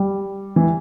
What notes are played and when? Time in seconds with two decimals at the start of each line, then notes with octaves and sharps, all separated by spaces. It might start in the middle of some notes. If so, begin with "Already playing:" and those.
Already playing: G3
0.56 E3